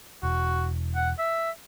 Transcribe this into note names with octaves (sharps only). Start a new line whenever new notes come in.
E1 F#4
F#5
E5